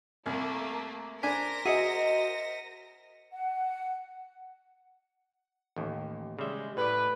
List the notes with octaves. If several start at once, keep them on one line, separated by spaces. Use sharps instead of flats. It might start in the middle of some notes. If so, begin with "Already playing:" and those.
C2 A3 A#3
D4 A#4 C5 G#5 A#6 B6
F#4 G#4 D#5 E5 C#7 D#7
F#5
A1 D#2
C#3 G3 G#3 E5
A2 B4 D5